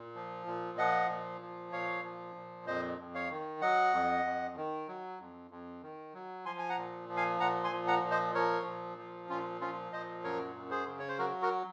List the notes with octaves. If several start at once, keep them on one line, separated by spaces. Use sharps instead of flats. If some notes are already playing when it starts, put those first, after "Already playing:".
Already playing: A#2
F3
A#2
F3 D#5 F#5
A#2
F3
A#2 C#5 F5
F3
A#2
F2 C5 D#5
F2
C#5 F5
D#3
F#3 D#5 F#5
F2
F2
D#3
F#3
F2
F2
D#3
F#3
F3 G#5 C6
G#5
F#5 A#5
A#2
F3
F5 G#5
A#2 F#5 A#5
G#5 C6
F3
F#5 A#5
A#2
C5 D#5
F3 A#4 C#5
A#2
F3
A#2 C#4 F4
F3 C#4 F4
A#2 C5 D#5
F#2 A#4 C#5
F#2
G#4 C5
C#3
C#5
C5
F#3 F#4 A#4
F#4 A#4